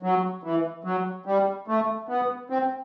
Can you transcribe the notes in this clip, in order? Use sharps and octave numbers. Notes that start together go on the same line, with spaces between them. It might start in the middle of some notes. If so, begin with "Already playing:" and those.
F#3
E3
F#3
G3
A3
B3
C4